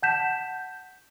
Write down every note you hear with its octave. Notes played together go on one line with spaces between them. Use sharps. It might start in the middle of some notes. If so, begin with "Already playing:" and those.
F#5 A5 G6 B6 E7